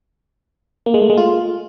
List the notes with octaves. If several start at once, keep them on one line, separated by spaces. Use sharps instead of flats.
A#3
G#3
A3
G#3
F4